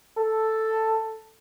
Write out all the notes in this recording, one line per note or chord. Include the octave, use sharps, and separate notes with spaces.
A4